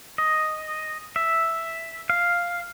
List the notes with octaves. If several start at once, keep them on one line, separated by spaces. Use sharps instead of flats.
D#5
E5
F5